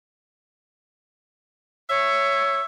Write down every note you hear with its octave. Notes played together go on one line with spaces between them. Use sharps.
C#5 E5